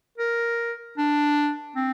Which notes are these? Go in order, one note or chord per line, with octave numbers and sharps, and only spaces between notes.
A#4
D4
C4